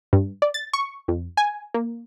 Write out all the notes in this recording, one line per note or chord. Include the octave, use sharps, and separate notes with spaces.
G2
D5
A6
C#6
F2
G#5
A#3